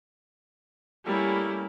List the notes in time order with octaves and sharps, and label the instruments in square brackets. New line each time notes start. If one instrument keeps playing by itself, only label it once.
[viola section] G3 A3 C#4 [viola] A#3 E4